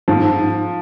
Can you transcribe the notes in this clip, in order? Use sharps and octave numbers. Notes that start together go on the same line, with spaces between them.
G#2 F3